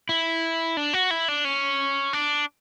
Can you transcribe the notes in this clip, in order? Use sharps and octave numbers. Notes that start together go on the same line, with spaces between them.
E4
D4
F#4
E4
D4
C#4
D4